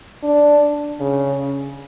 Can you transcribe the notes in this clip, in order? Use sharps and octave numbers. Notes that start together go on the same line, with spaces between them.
D4
C#3